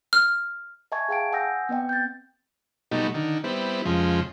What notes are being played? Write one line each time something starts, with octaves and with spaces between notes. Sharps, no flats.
F6
D#5 E5 G#5 A5 C#6 G#6
G#4 F5 G5 A5 D7
F#5 G#5 D#6 E6 G6 A#6
B3 C4 D#5 G5
G6 A6
B2 F#3 G3 A3 D#4
D3 D#3
G3 B3 C4 E4
F2 C#3 F3 G#3